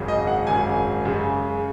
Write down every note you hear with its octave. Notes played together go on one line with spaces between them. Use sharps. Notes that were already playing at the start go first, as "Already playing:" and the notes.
Already playing: G#1 F#2 C#3
D#5
F#5
G#1 F#2 C#3 G#5
F#2 C#3 G#3